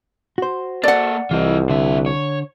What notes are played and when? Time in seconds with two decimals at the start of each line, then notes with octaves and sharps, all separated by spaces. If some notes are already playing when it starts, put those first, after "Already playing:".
0.38 F#4 C5
0.84 A#3 A4 D5 F#5
1.31 C2 E3 F4 D#5
1.70 D3 F3 E5
2.06 C#5